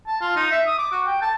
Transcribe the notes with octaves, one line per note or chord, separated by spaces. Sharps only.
A5
F4
D#4
E5
D#6
D6
F#4
G5
A5